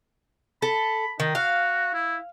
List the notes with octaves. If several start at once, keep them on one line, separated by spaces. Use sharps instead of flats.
A4 B5
D#3 D#4
F#4 F5
E4